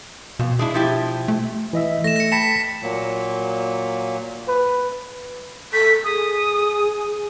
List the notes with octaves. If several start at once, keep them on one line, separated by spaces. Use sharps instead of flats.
F2 B2
G#3 D4 E4
F3 E4 G4
A3
E3 D#5 E5
A3 A#6 E7
A#6 C#7
G5 A5 B5 B6 C#7 E7
A#2 F#3 A#3
B4
A4 B6
G#4 D#6